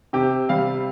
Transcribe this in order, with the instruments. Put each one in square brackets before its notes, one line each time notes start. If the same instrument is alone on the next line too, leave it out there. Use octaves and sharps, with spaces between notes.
[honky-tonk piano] C3 [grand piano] G4
[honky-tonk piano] G3 [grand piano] F5